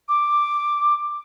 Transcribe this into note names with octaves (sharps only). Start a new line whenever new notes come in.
D6